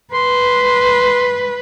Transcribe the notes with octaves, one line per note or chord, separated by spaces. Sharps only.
B4 C6